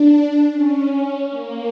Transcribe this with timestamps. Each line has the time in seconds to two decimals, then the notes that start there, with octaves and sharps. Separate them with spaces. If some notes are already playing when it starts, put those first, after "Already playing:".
Already playing: D4
0.51 C#4
1.30 A#3